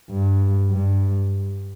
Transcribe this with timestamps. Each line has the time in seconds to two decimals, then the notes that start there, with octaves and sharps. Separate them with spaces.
0.10 G2
0.72 G2